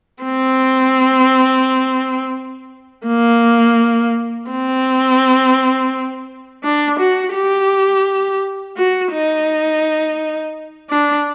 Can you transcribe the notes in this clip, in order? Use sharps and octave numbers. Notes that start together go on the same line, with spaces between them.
C4
A#3
C4
D4
F#4
G4
F#4
D#4
D4